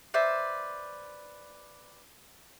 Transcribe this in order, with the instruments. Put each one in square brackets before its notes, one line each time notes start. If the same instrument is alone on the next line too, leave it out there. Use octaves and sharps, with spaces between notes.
[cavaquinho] B4 C5 D5 E5